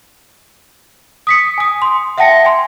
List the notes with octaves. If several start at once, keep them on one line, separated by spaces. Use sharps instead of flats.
D#6 B6 C#7
G#5 D#6
C6
E5 F#5 G5 A5 A#6 C#7
G#5 C6